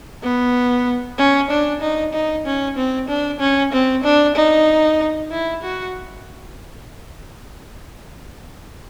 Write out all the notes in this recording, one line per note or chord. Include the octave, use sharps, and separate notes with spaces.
B3
C#4
D4
D#4
D#4
C#4
C4
D4
C#4
C4
D4
D#4
E4
F#4